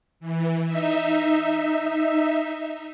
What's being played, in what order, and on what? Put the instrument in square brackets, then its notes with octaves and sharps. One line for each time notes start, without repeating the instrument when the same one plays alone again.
[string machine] E3
D#4 E5